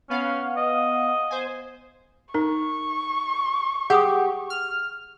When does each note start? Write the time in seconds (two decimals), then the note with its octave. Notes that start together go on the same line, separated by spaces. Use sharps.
0.10 B3 C#4 F5 F#5
0.57 D#5
1.30 C5 G#5
2.34 D#4 A#4 C#6
3.90 G4 G#4 F#5 D6 D#6
4.50 F6